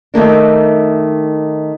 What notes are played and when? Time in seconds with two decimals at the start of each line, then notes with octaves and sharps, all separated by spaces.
0.14 D#3 A3 A#3 D4